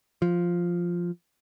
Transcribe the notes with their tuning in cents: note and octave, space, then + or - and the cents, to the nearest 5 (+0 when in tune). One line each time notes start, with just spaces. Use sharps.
F3 +0